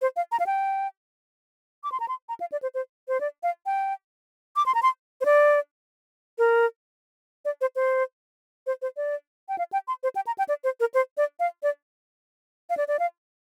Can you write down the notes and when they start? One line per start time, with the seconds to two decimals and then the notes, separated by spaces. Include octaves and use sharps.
0.02 C5
0.16 F5
0.32 A#5
0.40 F5
0.46 G5
1.84 D6
1.92 C6
2.00 A#5
2.08 C6
2.29 A#5
2.40 F5
2.52 D5
2.62 C5
2.74 C5
3.08 C5
3.20 D5
3.43 F5
3.66 G5
4.56 D6
4.66 C6
4.75 A#5
4.83 C6
5.21 C5
5.25 D5
6.38 A#4
7.45 D5
7.61 C5
7.76 C5
8.67 C5
8.82 C5
8.97 D5
9.49 G5
9.58 F5
9.73 G5
9.88 C6
10.03 C5
10.16 G5
10.27 A#5
10.38 G5
10.49 D5
10.64 C5
10.80 A#4
10.94 C5
11.17 D5
11.40 F5
11.63 D5
12.70 F5
12.77 D5
12.88 D5
12.99 F5